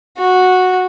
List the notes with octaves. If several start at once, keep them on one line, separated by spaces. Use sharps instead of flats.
F#4